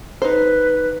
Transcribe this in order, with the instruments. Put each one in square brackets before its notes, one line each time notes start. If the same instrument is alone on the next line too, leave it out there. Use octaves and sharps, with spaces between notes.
[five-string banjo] D#4 C5 [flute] B4